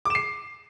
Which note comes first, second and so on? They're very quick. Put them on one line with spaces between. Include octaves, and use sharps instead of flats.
D6 E7 C7